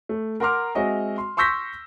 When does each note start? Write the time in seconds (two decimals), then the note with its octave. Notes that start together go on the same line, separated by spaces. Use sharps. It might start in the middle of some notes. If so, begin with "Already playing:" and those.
0.09 A3
0.40 A#4 F#5 A#5 C6 D6 F6
0.75 G#3 C4 F#4 D#5 E5
1.18 C6
1.37 C6 C#6 E6 G6 A#6 B6